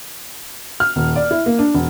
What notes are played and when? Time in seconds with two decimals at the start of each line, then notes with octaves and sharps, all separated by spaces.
0.80 F6
0.96 D#1
1.16 D5
1.31 E4
1.46 A#3
1.59 D4
1.74 E1